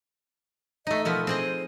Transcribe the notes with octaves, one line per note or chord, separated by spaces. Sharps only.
A3 D#4 D#5
B2 F3 B3 A#4
C4 G#4 C5 D#5